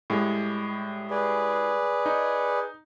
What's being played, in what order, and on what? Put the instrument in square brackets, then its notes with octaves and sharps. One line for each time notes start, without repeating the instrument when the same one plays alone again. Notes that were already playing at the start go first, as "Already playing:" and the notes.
[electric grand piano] A2 G3 G#3
[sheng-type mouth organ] G#4 B4 D5
[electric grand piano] D#4